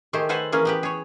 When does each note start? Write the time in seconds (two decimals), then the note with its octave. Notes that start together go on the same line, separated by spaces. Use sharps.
0.13 D#3 A3 G4 G#4 C5
0.29 A4 B4 C5 F#5 G#5
0.52 E3 A#3 C#4 G#4
0.65 B3 G4 B4
0.83 G#4 C#5